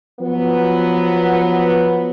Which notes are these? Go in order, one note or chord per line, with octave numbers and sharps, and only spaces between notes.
F3 F#3 B3